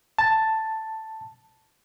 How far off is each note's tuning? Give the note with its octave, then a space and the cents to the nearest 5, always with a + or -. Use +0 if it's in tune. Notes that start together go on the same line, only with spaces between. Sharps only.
A5 +5